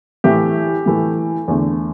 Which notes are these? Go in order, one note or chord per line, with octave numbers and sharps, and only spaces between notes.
A2 E3 A3 G4
A2 E3 A3
E2 D3 A3